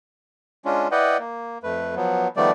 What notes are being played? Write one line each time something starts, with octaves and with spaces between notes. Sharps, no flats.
G#3 C#4 D4 F4
E4 B4 D5 D#5 F#5 G5
A#3
F2 A3 B4
F3 F#3 B3
D#3 F3 G3 A3 B3 D5